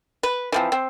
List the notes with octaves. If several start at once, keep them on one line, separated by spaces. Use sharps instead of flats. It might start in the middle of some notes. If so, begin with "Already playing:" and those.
B4
E3 F3 C4
C4